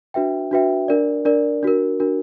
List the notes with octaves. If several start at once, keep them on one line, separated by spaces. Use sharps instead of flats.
D4 F#4 B4 E5 G5
D4 F#4 B4 E5 G5
D4 A#4 D5
D4 A#4 D5
D4 F#4 A#4
D4 F#4 A#4